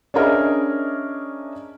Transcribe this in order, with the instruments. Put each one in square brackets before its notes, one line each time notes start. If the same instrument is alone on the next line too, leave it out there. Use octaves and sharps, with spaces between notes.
[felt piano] C#4 D4 G#4 A#4 D#5 E5